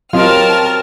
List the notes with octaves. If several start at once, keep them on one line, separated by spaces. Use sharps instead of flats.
F#3 C4 F4 G4 A#4 D#5 A5 F6